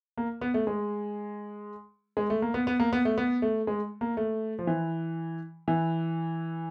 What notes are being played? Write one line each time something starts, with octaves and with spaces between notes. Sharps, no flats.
A#3
B3
A3
G#3
G#3
A3
A#3
B3
B3
A#3
B3
A3
B3
A3
G#3
A#3
A3
F3
E3
E3